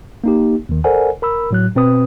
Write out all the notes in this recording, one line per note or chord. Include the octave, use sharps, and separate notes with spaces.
A#3 D#4 G4
D#2 D#3
A4 A#4 C5 D5 F#5 G#5
A#4 B5 E6
A2 F#3 F#6
B2 C4 B4 D#6